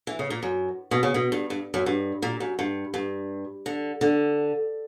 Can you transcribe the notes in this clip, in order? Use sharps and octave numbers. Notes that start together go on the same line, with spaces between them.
E3
C#3
A#2
F#2
B2
C#3
B2
G2
G2
F#2
G2
A#2
F#2
G2
G2
D3
D3